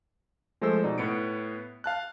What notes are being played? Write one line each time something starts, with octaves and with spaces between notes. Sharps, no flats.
F3 G#3 A3 A4 C5 E6
B2 D#4 D5
A2 B3 C#7 D7
F5 A5 F#6